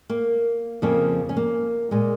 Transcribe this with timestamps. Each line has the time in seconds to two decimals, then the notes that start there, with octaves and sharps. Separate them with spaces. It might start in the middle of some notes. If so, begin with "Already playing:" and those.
0.10 A#3
0.82 F2 C#3 F3 A#3
1.29 C#4
1.37 A#3
1.91 A#2 G#3